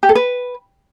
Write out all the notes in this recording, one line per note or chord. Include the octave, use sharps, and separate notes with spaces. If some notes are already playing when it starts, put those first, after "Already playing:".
G4
A4
B4